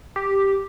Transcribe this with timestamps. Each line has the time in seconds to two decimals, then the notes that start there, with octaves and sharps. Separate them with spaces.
0.16 G4